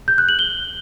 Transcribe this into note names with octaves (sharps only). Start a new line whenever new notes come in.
G6
F#6
F#7
G7